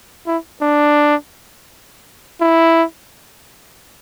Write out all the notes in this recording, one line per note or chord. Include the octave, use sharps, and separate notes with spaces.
E4
D4
E4